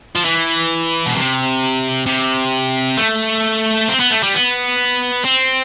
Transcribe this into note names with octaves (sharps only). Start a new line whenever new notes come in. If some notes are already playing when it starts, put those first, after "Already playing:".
F3
E3
B2
C3
C3
A3
C4
B3
A3
G3
B3
C4